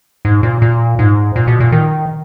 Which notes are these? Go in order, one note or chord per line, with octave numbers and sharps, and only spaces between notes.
G#2
A#2
A#2
G#2
A#2
B2
A#2
D#3